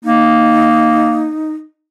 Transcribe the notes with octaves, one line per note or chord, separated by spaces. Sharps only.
A#3 D#4